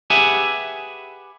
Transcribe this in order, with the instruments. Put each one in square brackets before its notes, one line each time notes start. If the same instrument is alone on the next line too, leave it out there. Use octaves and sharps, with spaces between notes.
[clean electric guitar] G4 G#4 B4 E5 F#5 G#5